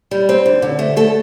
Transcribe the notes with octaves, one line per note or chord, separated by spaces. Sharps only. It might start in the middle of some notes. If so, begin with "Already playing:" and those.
G3
C4
D3
D3
A3
A3 A4